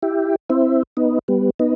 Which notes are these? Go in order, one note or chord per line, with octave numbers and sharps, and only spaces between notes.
E4 G4
C4 E4
B3 D#4
G3 B3
B3 D#4